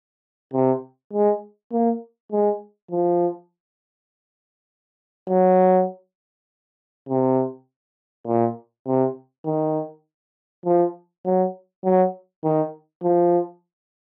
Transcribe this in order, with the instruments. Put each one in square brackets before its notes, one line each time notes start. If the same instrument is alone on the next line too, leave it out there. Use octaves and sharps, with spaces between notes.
[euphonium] C3
G#3
A#3
G#3
F3
F#3
C3
A#2
C3
D#3
F3
F#3
F#3
D#3
F3